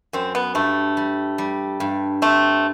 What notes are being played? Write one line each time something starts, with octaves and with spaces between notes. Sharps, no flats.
F#2 C4
B3
G2 A3
G3
G3
G2
A3 C4